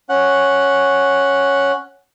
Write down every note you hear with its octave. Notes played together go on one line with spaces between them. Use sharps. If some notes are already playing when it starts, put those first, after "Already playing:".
C#4 F#5